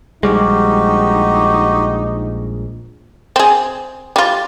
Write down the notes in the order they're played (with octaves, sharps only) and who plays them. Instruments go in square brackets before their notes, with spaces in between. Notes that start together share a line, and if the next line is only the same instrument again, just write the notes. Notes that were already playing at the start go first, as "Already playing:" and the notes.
[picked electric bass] A#1 G3 G#3 [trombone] D#4 [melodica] F#4 G4
[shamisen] C4 G#4
G3 F4